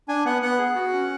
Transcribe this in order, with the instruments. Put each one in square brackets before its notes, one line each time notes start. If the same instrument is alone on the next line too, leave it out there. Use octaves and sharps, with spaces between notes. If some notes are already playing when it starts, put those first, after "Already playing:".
[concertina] D4 G#5
B3 F#5
B3 F#5
G#4
F#4
C#4